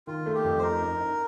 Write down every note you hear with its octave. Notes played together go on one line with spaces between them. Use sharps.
D#3 F4
A3
G4
F2
C5
D#4 A#4
D#4
D#4